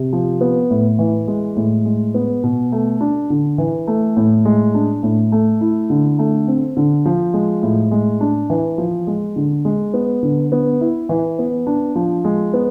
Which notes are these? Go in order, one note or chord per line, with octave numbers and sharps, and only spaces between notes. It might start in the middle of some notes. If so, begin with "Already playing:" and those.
Already playing: C3
F3
B3
A2
E3
G#3
A2
G#3
B3
B2
A3
D4
D3
E3
A3
A2
G#3
D4
A2
A3
E4
D3
A3
C4
D3
F3
G#3
A2
G#3
D4
E3
F3
G#3
D3
G#3
B3
D3
B3
E4
E3
B3
D4
F3
G#3
B3